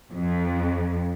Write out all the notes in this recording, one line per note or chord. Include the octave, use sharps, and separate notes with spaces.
F2